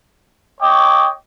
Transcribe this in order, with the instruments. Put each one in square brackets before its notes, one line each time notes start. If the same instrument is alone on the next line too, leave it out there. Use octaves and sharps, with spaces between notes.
[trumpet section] C#5 D#5 G5 C#6 D6